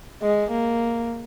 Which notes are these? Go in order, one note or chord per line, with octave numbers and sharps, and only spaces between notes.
G#3
A#3